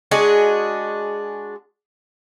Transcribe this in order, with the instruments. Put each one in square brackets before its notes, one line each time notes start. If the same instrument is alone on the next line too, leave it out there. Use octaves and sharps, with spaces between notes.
[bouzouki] G#3 D4 F#4 G#4